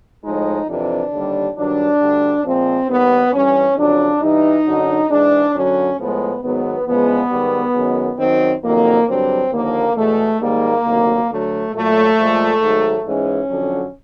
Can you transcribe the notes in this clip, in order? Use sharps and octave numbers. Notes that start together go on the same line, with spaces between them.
A2 F3 G#3 D#4
F2 C3 E3 D4
D#2 D3 G3
G2 D#3 F#3 D4
D2 D3 G3
A#2 F3 G#3 C4
D#2 D#3 G3 B3
G2 E3 G3 C#4
F2 C#3 F#3 D4
G2 E3 G3 D#4
F#2 D3 F#3
G#2 E3 G#3 D4
F#2 D3 F#3 C#4
A2 F3 G#3 B3
G#2 D#3 F#3 B3
E2 C#3 F3 G#3 B3
G#2 D#3 G3
F#2 D#3 G#3
F#2 D#3 F#3 C4
F2 C3 D#3 F#3 A#3
G2 D3 F#3 C4
D#2 D3 F3 A#3
E2 B2 G#3 A3
G#2 D#3 G3 A#3
D2 C3 D#3 F#3
D2 D3 F#3 A3
A#2 F#3 A3
A#2 F3 G#3
G#2 D#3 F#3
G#2 E3 G#3 C#4
F2 D3 F#3